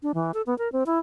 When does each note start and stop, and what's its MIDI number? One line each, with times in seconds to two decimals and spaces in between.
0.03 0.12 62
0.14 0.32 52
0.34 0.42 69
0.47 0.57 59
0.58 0.71 70
0.72 0.83 60
0.86 0.99 64